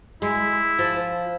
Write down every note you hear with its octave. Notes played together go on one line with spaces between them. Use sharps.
G#3 E4
F3